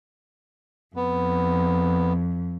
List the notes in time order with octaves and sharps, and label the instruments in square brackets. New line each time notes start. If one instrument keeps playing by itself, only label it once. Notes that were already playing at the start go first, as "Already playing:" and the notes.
[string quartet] F2 [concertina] B3